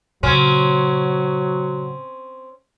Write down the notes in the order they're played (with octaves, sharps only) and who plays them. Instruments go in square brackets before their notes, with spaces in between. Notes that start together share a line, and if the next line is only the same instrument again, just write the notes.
[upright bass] A#2 C#3 [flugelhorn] F#3 [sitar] C4 C#4